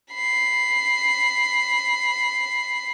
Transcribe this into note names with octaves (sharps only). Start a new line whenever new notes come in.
B5 C7